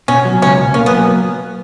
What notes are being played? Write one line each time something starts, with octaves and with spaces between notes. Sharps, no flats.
B2 C#4
F#3
C#2 C#4
B2
A#3 C#4
B3
F#3